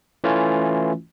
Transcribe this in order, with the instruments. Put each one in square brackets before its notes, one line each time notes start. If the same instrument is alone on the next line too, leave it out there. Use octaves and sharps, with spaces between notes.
[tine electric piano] E3 A3 C#4 E4 F4